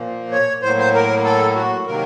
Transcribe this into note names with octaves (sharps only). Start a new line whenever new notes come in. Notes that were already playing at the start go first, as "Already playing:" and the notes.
Already playing: A#2 F3 A#3
C#5
A2 F#3 A#3 C5
C5
A#4
A4
F#4
C3 D#3 F#3 A#3 A#4